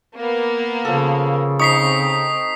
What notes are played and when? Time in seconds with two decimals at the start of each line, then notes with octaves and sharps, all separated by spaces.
0.17 A#3 B3
0.85 C#3 F3 A4
1.60 C4 D#4 C#6 D#6 B6 C7